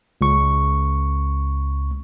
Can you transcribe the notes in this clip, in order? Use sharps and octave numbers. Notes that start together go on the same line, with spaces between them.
C#2 C#6